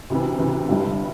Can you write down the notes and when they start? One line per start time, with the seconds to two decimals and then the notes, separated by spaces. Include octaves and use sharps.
0.10 D2 C3 E3
0.39 D2 C3 E3
0.68 G1 G2 G3 E4